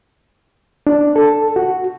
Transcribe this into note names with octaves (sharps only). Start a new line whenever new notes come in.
D4
A4
F#4